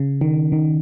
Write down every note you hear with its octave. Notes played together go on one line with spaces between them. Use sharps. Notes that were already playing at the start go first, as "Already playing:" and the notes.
Already playing: C#3
D#3
D#3